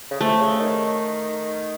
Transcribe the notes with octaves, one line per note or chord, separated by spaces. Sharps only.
C#3
C3 A3
C#3
D#3